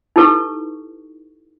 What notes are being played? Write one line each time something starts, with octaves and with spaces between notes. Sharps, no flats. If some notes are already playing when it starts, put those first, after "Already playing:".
D#4 E4 G4 A4 B4 C#6